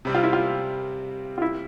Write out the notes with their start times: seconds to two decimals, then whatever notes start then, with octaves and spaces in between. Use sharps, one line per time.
0.05 C3 G3 C4
0.15 F4
0.23 E4
0.33 F4
1.38 F4
1.42 E4